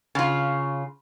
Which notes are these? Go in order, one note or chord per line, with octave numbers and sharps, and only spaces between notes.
C#3 F4